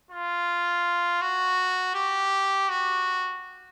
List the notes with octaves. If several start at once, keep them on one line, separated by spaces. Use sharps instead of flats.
F4
F#4
G4
F#4